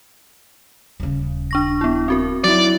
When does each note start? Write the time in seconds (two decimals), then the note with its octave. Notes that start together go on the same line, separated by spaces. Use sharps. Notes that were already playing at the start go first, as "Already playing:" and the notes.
1.00 D#1 C#3
1.51 D4 C#6 A#6
1.81 B3 E4
2.08 C4 F#4 A#4
2.44 F#3 E4 D5